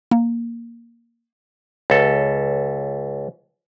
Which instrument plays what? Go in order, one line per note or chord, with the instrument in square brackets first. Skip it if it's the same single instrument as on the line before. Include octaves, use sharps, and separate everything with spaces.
[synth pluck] A#3
[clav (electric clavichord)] C#2 A4